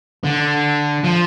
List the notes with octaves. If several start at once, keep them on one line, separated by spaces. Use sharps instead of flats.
D3
F3